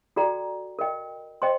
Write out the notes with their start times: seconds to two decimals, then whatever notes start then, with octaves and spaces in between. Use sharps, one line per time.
0.16 F#4 A4 D5 G5 A#5
0.79 A#4 D#5 G5
1.42 C5 D#5 G5 C6